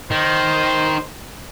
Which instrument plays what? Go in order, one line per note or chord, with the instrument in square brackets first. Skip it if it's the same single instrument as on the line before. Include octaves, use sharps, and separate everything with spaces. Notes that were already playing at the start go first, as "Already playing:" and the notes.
[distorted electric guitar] D#3 [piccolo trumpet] C5